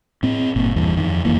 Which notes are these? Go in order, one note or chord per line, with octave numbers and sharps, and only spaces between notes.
A2 C4
G1 A#2
E2 G2 E3
F2 D#3
D1 F#2 E3 A#3